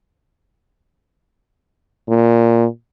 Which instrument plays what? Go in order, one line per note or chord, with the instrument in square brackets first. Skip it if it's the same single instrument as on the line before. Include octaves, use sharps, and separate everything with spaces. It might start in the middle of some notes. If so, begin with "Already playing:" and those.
[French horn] A#2